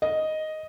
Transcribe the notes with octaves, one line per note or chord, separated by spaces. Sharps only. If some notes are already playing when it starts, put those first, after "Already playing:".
D#5